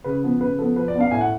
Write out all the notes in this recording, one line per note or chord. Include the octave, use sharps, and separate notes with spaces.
C#3 B4
F3 B3
C#3 B4
F3 B3 A4
F3 B4
D5
B3
D4 F5
A2 G#5
F#5